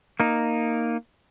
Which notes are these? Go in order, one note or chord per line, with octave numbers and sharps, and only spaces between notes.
A#3 D#4